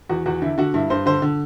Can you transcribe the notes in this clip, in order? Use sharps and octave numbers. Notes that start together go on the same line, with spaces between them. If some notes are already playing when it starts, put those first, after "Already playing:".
E2 F#4
E2 F#4
D3 E4
D3 F#4
G2 E4
G2 C5
D3 C5
D3